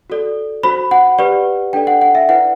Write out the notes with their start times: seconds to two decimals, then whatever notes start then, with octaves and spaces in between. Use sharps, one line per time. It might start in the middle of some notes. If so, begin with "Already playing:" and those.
0.10 F#4 A4 D5
0.63 F#4 C5 B5
0.91 F#5
1.19 G4 B4 D5
1.73 D4 A4 D5 G5
1.87 F#5
2.02 F#5
2.15 E5
2.29 E4 B4 D5 F#5